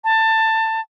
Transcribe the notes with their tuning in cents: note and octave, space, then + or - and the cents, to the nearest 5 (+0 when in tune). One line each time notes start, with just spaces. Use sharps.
A5 +20